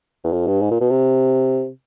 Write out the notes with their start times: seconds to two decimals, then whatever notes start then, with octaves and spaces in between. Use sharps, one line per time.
0.24 E2
0.33 F2
0.47 G2
0.62 G#2
0.71 A#2
0.81 B2
0.90 C3